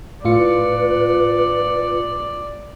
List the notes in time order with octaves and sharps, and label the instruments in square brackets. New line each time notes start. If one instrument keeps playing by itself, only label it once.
[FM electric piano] A2 F4 C#7 [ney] B4 [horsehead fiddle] D5